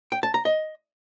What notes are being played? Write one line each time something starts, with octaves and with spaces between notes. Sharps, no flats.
G5
A5
A#5
D#5